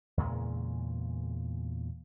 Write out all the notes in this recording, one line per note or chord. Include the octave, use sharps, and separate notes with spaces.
E2 A#2 C#3 G#3